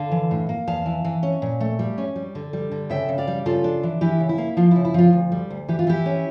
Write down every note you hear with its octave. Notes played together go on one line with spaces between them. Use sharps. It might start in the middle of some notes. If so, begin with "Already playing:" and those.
Already playing: D3 F5 A5
E3
A2
A#3
E2 F5 A5
E3
E3
C#4
A#2
A3
G3
C#4
G3
D3
G3
D3
C#3 E5 G5
C#3
D5 F5
G3
C#3 F4 A4
D4
E3
E3 E4 G4
C#3
E4
A#3
F3 F4
E4
C#3
E4
F3 F4
D2
G3
D2
E3 G4
F4
E3 E4 G4
C#4